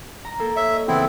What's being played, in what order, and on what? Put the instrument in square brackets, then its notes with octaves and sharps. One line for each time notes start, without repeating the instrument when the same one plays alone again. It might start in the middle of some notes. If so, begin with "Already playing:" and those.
[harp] A#5
A#3 A4 A#4
[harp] C#5 [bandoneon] E5
[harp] D#5
[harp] C#2 E3 [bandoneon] B3 C4 E4